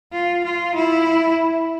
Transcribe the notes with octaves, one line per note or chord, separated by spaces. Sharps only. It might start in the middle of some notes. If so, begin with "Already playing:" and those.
F4
F4
E4